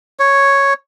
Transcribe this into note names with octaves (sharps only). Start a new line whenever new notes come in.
C#5